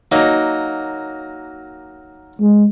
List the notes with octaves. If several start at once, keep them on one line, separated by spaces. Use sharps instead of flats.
F#3 A#3 D#4
G#3